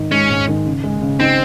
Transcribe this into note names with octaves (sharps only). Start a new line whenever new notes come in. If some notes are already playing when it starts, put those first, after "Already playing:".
Already playing: G#2 D#3 D#4
G#3 C#4
G#2
D#3
C#3
G#3
C#3
C4 D#4